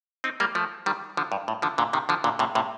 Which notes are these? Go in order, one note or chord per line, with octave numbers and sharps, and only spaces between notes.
C4 D#4
G3 A#3
F3 A3
D#3 G3
D3 F3
G2
A2
D3 F3
A#2 D3
C3 D#3
D3 F3
A#2 D3
A2 C3
A2 C3